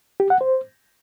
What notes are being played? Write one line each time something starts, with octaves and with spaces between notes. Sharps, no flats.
G4
F#5
C5